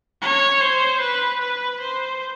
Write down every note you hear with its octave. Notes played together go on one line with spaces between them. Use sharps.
C#5
C5
B4
B4
C5